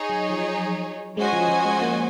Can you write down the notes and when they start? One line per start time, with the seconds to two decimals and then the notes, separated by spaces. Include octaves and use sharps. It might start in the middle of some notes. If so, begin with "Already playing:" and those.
Already playing: D#4 G#4 C#5
0.10 F#3
0.30 F3
1.17 G#3 C#4 F#4 C5 D#5 G#5
1.33 F3
1.48 F3
1.65 G#3
1.82 A#3